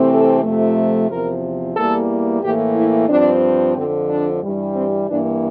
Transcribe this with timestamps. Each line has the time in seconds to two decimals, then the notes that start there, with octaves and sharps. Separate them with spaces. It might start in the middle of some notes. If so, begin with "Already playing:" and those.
Already playing: C3 E3 A3 C4
0.10 A4
0.43 F2 C3 F3 A3
1.09 E2 C3 F3 A#4
1.76 E2 E3 G3 A#3 A4
2.42 A2 E3 A#3 G4
2.76 E4
3.09 G2 F3 C4 D4
3.75 F2 D3 F3 C4
4.09 D4
4.42 G2 E3 G3
4.74 C4
5.08 G2 E3 A#3 D4